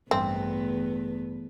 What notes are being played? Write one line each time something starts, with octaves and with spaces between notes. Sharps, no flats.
A1 E2 G2 A3 B3 C4